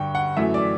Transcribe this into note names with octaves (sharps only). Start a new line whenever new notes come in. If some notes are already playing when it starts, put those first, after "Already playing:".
Already playing: G2 D3 G5 C#6
F#5
F#2 E3 A3 E5
D5